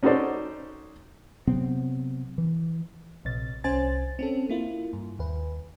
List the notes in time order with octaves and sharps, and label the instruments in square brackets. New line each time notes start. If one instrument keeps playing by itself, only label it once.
[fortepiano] C#4 D#4 F#4 A4 C5 D5
[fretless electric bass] C3 F#3 B3 C4
E3
[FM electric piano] A#1 C3 A6
C2 C#4 C5 G#5 A6
C4 C#4 A4
A#3 E4 F4
G2
D#2 B4